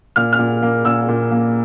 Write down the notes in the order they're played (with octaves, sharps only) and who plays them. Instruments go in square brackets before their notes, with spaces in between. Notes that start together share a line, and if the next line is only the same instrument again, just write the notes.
[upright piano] A#2 F6
F6
A#2
A#3
A#2 E6
A#2
A#3